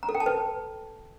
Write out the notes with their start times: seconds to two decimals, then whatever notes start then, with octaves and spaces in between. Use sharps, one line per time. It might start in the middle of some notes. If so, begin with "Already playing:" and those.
0.03 A#5
0.09 A4
0.15 G5
0.20 A5
0.26 B4